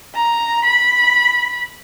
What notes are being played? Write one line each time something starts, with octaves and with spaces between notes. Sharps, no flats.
A#5
B5